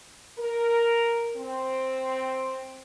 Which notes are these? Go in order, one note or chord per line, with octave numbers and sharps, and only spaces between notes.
A#4
C4